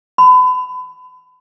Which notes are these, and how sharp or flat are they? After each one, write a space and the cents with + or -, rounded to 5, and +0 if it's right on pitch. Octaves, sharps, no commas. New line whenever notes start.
B5 +35